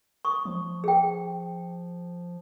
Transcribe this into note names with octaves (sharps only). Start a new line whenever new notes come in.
C#6 D#6
F3
G#4 G5